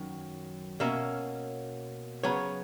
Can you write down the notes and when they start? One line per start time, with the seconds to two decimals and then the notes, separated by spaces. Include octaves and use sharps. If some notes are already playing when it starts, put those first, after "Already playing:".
Already playing: F#2 D#3 F#3
0.80 B2 A#3 C#4 E5
2.23 C#3 F#3 B3 C#5